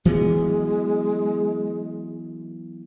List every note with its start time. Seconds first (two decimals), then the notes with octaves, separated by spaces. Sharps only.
0.05 E3 F#3 G#3 B3